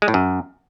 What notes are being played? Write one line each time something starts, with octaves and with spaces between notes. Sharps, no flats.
G#3
A2
F#2